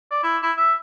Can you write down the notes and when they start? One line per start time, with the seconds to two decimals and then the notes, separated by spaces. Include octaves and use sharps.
0.11 D5
0.23 E4
0.42 E4
0.57 E5